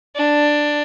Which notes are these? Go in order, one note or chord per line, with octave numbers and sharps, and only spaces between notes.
D4